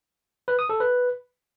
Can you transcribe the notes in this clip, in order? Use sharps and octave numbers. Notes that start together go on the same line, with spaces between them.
B4
D#6
A4
B4